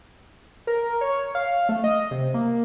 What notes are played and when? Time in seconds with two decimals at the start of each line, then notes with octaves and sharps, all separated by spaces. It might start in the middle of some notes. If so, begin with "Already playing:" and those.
0.67 A#4
1.01 C#5
1.35 F5
1.69 A3
1.84 D#5
2.11 C3
2.34 A#3